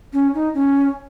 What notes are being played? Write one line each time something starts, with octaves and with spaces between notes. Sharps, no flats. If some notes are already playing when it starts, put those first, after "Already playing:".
C#4
D#4
C#4